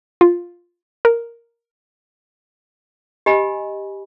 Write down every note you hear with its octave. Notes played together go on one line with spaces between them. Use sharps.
F4
A#4
G4 D#5 G#5 B5